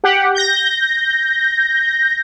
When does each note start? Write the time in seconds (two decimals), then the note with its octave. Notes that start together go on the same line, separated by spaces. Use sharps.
0.04 G4 F#5
0.35 G6 A#6